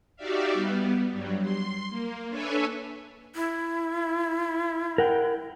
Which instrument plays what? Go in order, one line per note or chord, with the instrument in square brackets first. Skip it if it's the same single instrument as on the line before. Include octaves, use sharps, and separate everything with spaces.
[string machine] D#4 F#4 G4 D5 E5 F5
G3 B3
G2 F#3 G3
C6
A#3
D4 A4 B4 C#5 E5 G#5
[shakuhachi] E4
[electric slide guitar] A#4 F#5 G5